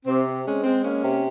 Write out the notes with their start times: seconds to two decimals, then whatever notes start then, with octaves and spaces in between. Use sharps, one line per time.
0.05 C3 C4
0.26 C4
0.45 G#3 C#4
0.63 G#3 C4
0.83 A#3 C#4
1.02 C3